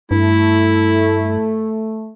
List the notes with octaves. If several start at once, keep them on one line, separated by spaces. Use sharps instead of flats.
G2 A3 E4